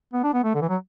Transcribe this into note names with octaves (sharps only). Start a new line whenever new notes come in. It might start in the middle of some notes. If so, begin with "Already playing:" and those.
B3
D4
B3
A3
D3
E3
F#3